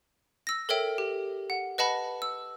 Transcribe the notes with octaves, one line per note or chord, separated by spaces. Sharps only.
E6 A#6
A4 A#4 C#5 E5 G5
G4
F#5
B4 D#5 F#5 A5 B5
E6